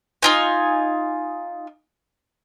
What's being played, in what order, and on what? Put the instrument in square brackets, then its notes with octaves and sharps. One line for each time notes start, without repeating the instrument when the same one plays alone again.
[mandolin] D#4 F4 G#5